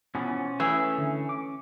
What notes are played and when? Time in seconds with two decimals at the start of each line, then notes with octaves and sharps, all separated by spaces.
0.15 B2 E3 F3 C#4
0.60 E3 A3 G#4 E5
0.98 D3
1.29 D6